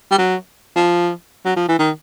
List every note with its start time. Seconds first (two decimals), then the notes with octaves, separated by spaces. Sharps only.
0.11 G3
0.18 F#3
0.76 F3
1.45 F#3
1.56 F3
1.68 E3
1.79 D#3